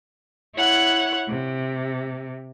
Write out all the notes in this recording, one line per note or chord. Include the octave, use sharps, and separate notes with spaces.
E4 C#5 F#5 F#6
C3